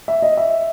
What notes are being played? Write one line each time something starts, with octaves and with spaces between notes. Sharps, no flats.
E5
D#5
E5